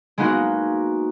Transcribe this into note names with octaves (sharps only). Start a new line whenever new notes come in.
G#3 A#3 B3 D#4 F#4